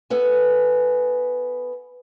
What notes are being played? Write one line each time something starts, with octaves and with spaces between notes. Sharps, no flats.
B3 A4 B4 G#5